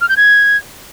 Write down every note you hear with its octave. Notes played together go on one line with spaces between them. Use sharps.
F6
G6
G#6